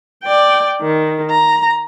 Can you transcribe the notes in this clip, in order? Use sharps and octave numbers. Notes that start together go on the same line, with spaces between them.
D5 G5
D#3
A#5